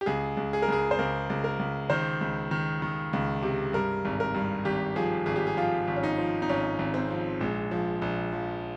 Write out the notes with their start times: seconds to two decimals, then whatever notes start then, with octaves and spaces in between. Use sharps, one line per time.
0.01 G4
0.06 C#2 G#4
0.37 C#2
0.53 G#4
0.62 A#4
0.68 C#2 G#4
0.91 C5
0.99 C#2 A#4
1.30 C#2
1.44 A#4
1.59 C#2
1.90 D#3 C5
2.21 C#2
2.51 D#3
2.82 D#3
3.13 C#2
3.42 C3
3.73 G2 A#4
4.05 G#1
4.20 A#4
4.34 G2
4.65 G#1 G4
4.96 F3 G#4
5.26 G#1 G#4
5.36 G4
5.47 G#4
5.57 F3 F4
5.87 G#1
5.96 C#4
6.03 D#4
6.18 F3
6.42 D#4
6.49 G#1 C#4
6.79 G#1
6.94 C4
7.10 F3
7.40 A#1 G#3
7.71 F3
8.02 A#1
8.33 F3